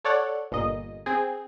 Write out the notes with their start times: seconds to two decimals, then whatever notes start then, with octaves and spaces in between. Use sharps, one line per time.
0.04 A4 C#5 D5 F#5
0.52 G1 A#2 D#5
1.06 C4 G#4